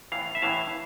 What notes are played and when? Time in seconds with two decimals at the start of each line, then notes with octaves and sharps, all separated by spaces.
0.12 A2 E3 F5
0.35 E5
0.42 A2 E3 F5